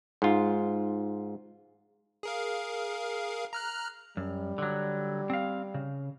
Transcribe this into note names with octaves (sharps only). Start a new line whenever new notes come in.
G#2 F4
G#4 A#4 F5
A#5 F6 F#6
F#2 G3
D3 F#3
C4 F5
C#3